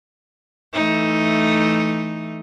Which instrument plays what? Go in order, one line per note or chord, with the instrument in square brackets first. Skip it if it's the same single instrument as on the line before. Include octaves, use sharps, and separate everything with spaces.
[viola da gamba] E3 A3 D#4